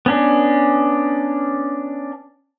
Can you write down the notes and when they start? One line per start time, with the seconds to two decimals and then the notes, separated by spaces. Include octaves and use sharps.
0.06 B3 C#4 D4